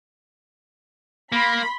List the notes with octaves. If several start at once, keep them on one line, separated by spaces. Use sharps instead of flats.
A#3 B5 C6